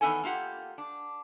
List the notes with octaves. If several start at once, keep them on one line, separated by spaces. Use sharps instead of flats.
E2 D#3 B3 E4 A4 G#5
A#3 F4 G4 F#5
D4